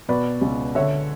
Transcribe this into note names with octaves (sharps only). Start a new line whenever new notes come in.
B2 B4 D5
C#2
D3 C#5 E5